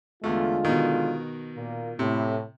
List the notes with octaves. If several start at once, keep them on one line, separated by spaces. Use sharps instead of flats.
E2 D3 G#3 A3 F4
B2 D#3
A#2 A#3
A2 C3